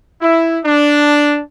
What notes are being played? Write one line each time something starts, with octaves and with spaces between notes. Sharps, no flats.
E4
D4